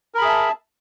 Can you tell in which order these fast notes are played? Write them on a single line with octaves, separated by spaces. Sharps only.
A#4 B5 G#4 E5 A5